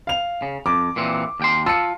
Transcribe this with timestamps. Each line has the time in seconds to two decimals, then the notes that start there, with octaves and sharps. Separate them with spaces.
0.07 F5 F7
0.42 C#3
0.66 F2 D6
0.96 A#2 E3 C4
1.40 D#2 G5 C6
1.66 F4 A5 E6 C#7